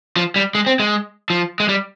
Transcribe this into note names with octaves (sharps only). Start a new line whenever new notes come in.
F3
G3
G#3
C4
G#3
F3
G#3
G3